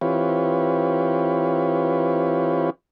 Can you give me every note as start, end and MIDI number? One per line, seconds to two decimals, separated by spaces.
0.01 2.70 52
0.01 2.70 60
0.01 2.70 65
0.01 2.70 67
0.01 2.70 71
0.01 2.70 73